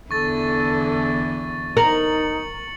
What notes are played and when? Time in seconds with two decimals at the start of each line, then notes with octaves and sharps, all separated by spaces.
0.11 E2 D3 E3 A4 C#6 A6
1.77 D#4 A#4 C#7 F#7